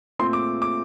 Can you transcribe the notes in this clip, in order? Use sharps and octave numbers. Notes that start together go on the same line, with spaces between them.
A#2 A3 C4 C6
D6
D6